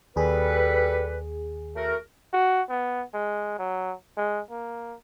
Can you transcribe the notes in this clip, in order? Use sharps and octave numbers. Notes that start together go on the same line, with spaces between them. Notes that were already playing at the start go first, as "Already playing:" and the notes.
D#2 G3 G#4 A4 B4
A3 F#4 A#4
F#4
B3
G#3
F#3
G#3
A#3